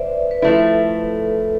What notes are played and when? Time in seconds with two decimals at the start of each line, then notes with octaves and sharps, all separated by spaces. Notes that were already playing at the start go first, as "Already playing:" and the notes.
Already playing: B4 C5 D5 E5
0.31 B4
0.42 F3 A3 E4 A4